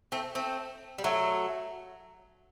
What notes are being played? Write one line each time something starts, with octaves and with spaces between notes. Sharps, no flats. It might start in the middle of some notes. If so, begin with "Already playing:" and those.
A3 C4
A3 C4
G3
F#3 A3